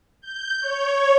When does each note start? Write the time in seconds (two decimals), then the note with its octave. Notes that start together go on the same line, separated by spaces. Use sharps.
0.21 G6
0.61 C#5